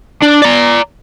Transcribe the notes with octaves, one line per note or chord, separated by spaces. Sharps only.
D4
D5 A#5